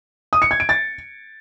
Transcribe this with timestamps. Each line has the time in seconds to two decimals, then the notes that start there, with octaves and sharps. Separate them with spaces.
0.33 D#6
0.42 C#7
0.51 G#6
0.60 D7
0.69 A6